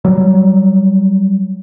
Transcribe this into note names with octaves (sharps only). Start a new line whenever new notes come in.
F#3 G3